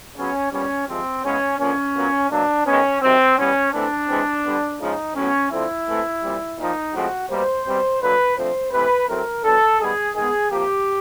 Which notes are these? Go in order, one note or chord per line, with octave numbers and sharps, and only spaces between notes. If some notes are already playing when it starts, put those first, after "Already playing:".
C#3 F#3 B3 C#4
A#2 G3 B3 C#4
C3 F3 G#3 C4
C#3 E3 G#3 B3 C#4
D3 F3 A#3 C#4
A#2 F#3 B3
B2 F#3 A#3 D4
D#3 G#3 B3 C#4
C3 D#3 F#3 C4
E3 G3 B3 C#4
E3 A3 C4 D4
E3 G#3 C4
D3 G3 B3
C#3 F3 G#3 D#4
A2 F#3 B3 C#4
D3 F3 A3 C4 E4
E3 A3 C4
A#2 G3 C4
A#2 F3 A#3 D#4
A2 F3 G#3 C4 F#4
B2 G3 A#3 C5
B2 G3 C4
D3 F#3 A#3 B4
D3 F3 A3 C4 C5
C3 E3 A3 B4
A2 F#3 A3 C4 A#4
D3 F#3 B3 A4
D#3 G3 B3 G#4
D#3 G#3 B3 G#4
C3 F3 A#3 G4